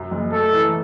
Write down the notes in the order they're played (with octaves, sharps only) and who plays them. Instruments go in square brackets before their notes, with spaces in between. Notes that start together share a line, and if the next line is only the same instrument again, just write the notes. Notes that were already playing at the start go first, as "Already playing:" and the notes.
Already playing: [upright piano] F#2
F#1
[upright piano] A3 [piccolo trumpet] A4
[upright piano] E3